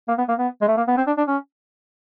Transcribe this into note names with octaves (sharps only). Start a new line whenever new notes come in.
A#3
B3
A#3
B3
G#3
A3
A#3
B3
C4
D4
D4
C#4